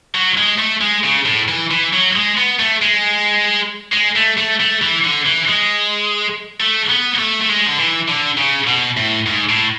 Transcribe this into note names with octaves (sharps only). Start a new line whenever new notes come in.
F#3
G#3
A3
G#3
C#3
A2
E3
E3
F#3
G#3
B3
A3
G#3
G#3
A3
A3
A3
E3
D3
E3
G#3
A3
B3
A3
A3
G#3
D3
E3
D3
C#3
B2
A2
G#2
A2